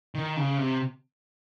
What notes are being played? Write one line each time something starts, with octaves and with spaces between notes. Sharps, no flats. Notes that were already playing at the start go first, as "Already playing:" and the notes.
D#3
C#3
C3